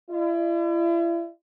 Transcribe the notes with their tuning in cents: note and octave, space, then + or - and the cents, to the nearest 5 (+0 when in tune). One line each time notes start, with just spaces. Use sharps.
E4 +40 D#5 -40